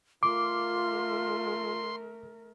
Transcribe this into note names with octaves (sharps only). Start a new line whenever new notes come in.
A3 F4 A#4 C6 D6